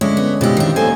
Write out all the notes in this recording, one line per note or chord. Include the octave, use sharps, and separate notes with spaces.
D3 G#3 C#4 E4
B3
B2 F3 G#3 E4 G4
D#3 D4
D#2 A4 C5 G#5